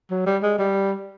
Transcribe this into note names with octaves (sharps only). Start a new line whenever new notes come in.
F#3
G3
G#3
G3